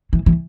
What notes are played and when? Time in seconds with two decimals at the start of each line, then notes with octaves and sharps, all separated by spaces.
0.13 E3
0.26 E3